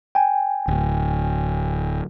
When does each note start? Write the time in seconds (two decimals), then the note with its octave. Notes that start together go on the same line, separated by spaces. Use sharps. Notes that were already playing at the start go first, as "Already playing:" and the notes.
0.15 G5 G#5
0.68 D1